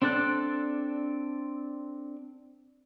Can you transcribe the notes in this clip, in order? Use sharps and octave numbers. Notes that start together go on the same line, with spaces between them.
C4 D4 A4 D5 F#6